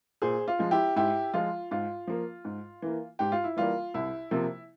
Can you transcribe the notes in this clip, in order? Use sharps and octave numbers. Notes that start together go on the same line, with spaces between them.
A#2 G#4 C5
F4
F3 G#3
E4 G4
G#2 E4 G4
F3 G#3 F4
G#2 F4
F3 A#3
G#2
E3 A#3
G#2 G4
F4
E4
E3 G3 A#3 F4
C2 E4
C3 F3 A#3